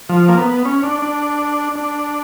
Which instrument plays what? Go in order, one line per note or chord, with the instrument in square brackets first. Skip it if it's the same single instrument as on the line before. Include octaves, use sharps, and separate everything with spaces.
[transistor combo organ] F3
A#3
B3
C#4
D4
D4
D4